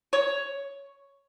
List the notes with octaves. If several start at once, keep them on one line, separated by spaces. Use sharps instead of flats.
C#5